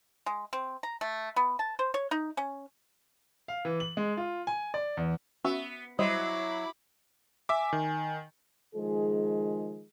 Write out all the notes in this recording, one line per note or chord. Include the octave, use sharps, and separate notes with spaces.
G#3
C4
A#5
A3
B3
A5
C5
C#5
D#4
C#4
F5
E3
F#7
G#3
F4
G#5
D5
E2
B3 C#4 F#4 E5
F#3 G3 E4 C5 D#5 B5 D6
E5 G#5 D6
D#3
D#3 F3 G#3 G#4